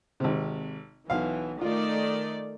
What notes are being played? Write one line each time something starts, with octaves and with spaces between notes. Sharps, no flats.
G#1 C3
B1 E3 F5
D#3 A3 F4 D5